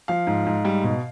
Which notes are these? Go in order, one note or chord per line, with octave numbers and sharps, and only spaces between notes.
F3 F5
G#2
G#2
G3
B2